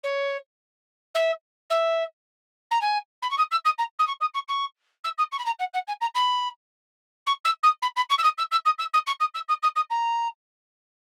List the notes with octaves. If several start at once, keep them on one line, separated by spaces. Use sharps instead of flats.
C#5
E5
E5
A#5
G#5
B5
C#6
D#6
E6
D#6
A#5
D#6
C#6
D#6
C#6
C#6
E6
D#6
C#6
B5
A#5
F#5
F#5
G#5
A#5
B5
C#6
E6
D#6
B5
B5
C#6
E6
D#6
E6
E6
D#6
E6
D#6
C#6
D#6
E6
D#6
D#6
D#6
A#5